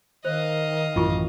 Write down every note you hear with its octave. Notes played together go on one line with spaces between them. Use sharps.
D#3 C5 D#5 F5
A1 F#2 E4 F4 C#6